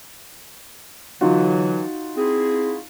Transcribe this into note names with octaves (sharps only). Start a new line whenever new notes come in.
D3 E3 F#3 D#4 F4 F#4
C4 E4 G#4